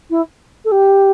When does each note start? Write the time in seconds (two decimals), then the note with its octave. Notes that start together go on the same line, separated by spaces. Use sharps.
0.10 E4
0.65 A4
0.72 G4